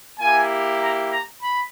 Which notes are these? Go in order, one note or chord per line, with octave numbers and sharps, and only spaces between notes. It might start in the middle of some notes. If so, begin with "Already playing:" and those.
A#3 E4 G4 G#5
A#5
A#5
B5